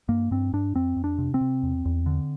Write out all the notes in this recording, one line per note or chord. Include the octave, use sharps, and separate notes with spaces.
G2 A#3
G2 C4
G2 D4
F2 C4
F2
D4
C3
C4
C3
E2
E2
D3